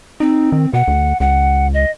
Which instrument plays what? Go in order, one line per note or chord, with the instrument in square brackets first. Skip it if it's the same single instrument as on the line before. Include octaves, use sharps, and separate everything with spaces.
[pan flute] C4 [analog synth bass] D#4
[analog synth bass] D#3
[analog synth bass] B2 [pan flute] F#5
[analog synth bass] D2
[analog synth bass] C#2 [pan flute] F#5
[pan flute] D#5